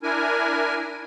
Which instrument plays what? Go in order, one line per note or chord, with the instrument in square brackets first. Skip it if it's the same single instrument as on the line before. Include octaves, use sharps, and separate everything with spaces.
[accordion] D4 E4 A#4 G#5